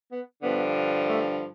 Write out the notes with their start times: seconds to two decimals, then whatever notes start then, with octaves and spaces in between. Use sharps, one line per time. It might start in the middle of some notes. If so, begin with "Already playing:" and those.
0.09 B3
0.42 G2 D3 F3 B3
1.08 A3